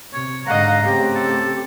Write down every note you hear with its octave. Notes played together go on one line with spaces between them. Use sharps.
C3 C#5
G#2 D3 D#5 F5 F#5 A#5
C#3 A3 C4 G4
A4